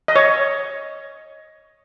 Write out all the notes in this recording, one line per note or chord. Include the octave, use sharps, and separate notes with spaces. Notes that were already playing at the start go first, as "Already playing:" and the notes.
D#5
C#5